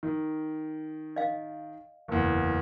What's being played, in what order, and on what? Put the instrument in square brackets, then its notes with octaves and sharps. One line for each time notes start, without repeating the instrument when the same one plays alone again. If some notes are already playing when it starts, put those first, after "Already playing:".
[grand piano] D#3
[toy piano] D#5 F5
[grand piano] F#1 E2